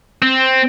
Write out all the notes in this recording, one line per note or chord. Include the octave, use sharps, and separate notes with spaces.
C4